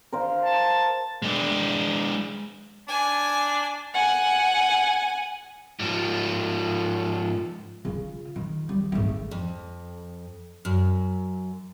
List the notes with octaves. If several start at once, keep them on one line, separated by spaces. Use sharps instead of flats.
A#4 C5 F5
A5
G#3 D4
D4 G#5
F#5 G#5
G#2 F3
C#3 F4
D#3
G3
G#1 A3
F2
F#2